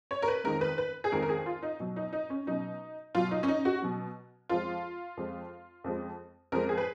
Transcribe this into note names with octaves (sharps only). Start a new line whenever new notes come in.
C#5
A#4
B4
F2 D#3 G#3 A#4
B4
B4
G#4
F2 D#3 G#3 A#4
A#4
G#4
F4
D#4
B2 F#3
D#4
D#4
C#4
B2 F#3 D#4
B2 F#3 F4
D#4
C#4
D#4
F#4
B2 F#3
F2 F3 G#3 F4
F2 F3 G#3
F2 F3 G#3
F2 F3 G#3 A#4
G#4
B4